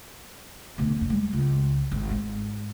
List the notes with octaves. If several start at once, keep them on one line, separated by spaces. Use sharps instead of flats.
D2 B2
F#1 F2
G3 G#3
C#2
G#1
G#2